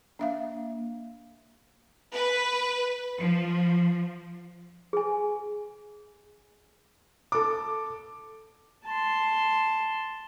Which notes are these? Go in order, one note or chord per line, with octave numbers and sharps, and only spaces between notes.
A#3 D4 E5 F5
B4
F3
G#4 G#5
A4 D6
A5 C6